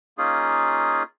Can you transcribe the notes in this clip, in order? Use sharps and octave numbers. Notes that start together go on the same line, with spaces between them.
A#3 C#4 D#4 F4 G#4